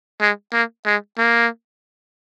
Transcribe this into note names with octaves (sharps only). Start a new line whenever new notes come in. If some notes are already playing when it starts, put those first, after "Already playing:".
G#3
A#3
G#3
A#3